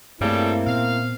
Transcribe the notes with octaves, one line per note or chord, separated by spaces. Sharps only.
G2 C#3 G3 A3 A#3 C4 E4 A4
A#2 B3 F5